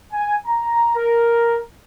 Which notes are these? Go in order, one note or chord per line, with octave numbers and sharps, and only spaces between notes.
G#5
A#5
A#4